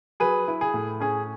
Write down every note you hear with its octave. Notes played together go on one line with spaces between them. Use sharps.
F#3 G#4 B4
E4
G#4
A2
C#4 G#4